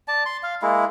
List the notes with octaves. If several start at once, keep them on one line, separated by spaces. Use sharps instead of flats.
D5 A5
C6
F5
G#3 A#3 E4